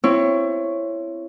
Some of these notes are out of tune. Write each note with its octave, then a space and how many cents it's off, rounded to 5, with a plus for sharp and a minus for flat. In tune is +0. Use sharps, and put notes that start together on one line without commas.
C4 +10 E4 +25 C#5 +0